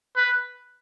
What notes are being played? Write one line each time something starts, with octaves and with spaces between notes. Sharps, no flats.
B4